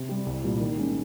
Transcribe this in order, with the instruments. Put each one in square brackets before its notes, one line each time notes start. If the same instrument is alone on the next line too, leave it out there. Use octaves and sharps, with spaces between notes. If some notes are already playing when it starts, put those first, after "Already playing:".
Already playing: [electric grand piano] C3
G3 C4 G4
C2
A#2 G3 A#3
D#3
G#3 C#4